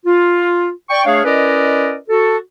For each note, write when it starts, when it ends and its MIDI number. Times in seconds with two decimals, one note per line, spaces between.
0.05 0.69 65
0.90 1.01 74
0.90 1.01 79
0.90 1.01 85
1.05 1.24 57
1.05 1.24 62
1.05 1.24 68
1.05 1.24 73
1.05 1.24 77
1.24 1.95 61
1.24 1.95 64
1.24 1.95 70
1.24 1.95 71
1.24 1.95 74
1.24 1.95 75
2.08 2.36 66
2.08 2.36 69